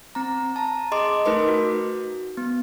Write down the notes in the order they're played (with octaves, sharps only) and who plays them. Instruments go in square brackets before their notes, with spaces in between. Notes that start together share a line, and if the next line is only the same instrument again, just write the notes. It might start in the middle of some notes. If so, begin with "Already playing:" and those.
[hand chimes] C4 A#5
A5 A#5
G#4 D#5 C6 D6
A3 D#4 A#4 B4 C6 D6
F#4
B3